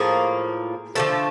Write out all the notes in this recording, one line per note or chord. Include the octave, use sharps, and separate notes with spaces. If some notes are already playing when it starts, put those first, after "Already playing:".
Already playing: A2 F3 A#3 G#4
D3 F3 A3 A4